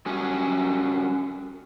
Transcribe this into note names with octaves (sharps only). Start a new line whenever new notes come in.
G3 C#4 F#4 G#5